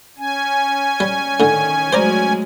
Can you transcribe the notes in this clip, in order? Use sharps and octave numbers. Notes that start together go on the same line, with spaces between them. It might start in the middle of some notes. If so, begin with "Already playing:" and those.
C#4 G#5
G3
A2 D3 D#3
F#3 G#3 A3 C5 D5 A#5